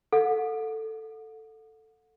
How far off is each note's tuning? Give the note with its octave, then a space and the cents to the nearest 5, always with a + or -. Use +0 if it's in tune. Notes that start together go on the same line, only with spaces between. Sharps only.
A4 +5 F#5 -35